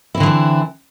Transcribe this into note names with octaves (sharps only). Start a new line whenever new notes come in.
D3 E3 F#3 C4 E4